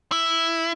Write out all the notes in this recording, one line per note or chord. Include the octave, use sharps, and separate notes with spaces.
E4